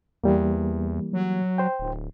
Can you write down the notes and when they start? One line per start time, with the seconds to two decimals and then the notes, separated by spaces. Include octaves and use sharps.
0.24 E2 E3 G3 A#3
1.13 F#3
1.58 C5 G5
1.80 D1